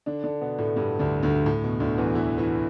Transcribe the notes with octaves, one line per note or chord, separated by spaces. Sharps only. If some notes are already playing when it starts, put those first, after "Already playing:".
D3 D4
D3 D4
B2 B3
A2 A3
G2 G3
D2 D3
D2 D3
A2
B2
D2 D3
E2 E3
E3 E4
E3 E4